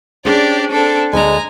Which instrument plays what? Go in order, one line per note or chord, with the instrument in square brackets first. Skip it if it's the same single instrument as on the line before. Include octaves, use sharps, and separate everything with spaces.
[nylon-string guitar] C#4 G#4 C5 [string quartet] D4 G4 D5
[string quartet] C4 D4 A4
[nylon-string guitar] D2 A4 D5 [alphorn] G#3 [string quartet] G#5 A#5